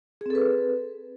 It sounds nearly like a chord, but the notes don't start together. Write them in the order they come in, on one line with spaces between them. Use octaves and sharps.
G#4 C4 A4 B4